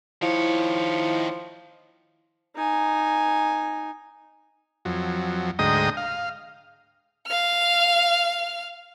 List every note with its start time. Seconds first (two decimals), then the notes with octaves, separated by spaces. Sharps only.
0.22 D#3 F3 E4 C#5
2.56 D#4 G#5
4.85 F2 F#3
5.59 D2 G#2 D#5 G5 A#5 D#6
5.97 F5
7.28 F5 F6